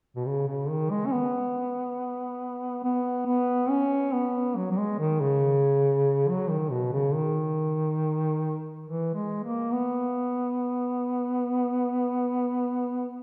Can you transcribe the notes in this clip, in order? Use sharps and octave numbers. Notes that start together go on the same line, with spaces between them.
B2
C#3
C#3
D#3
G#3
C#4
B3
B3
B3
C#4
B3
F#3
F#3
G#3
D#3
C#3
F#3
D#3
B2
C#3
D#3
E3
G#3
A#3
B3